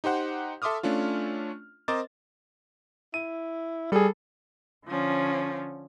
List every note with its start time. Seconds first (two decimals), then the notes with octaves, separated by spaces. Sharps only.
0.04 D#4 G4 C5 F#5
0.62 A4 E5 C6 D6 D#6 F6
0.83 A3 C#4 D4 F4
1.88 C4 A#4 C5 D#5 D6 A6
3.14 E4 D#7
3.92 G3 G#4 A4
4.86 D3 F3 C#4